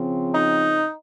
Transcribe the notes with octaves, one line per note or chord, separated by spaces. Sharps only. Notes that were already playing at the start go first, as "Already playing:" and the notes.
Already playing: C#3 F3 C4
D#4